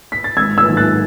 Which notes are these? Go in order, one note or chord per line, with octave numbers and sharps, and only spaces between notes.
B6
A6
G#1 E6 G#6
E6 G#6
G#2 D#3 F#3
F#6 A6